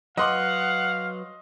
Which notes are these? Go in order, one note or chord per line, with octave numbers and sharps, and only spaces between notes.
F#3 B4 D#5 F5 F#5 C6 D6 F6